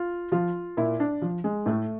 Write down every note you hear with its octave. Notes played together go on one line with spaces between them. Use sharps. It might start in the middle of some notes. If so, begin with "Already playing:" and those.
Already playing: F4
F3 F4
A#2 E4
D4
F3
G#3
A2 A3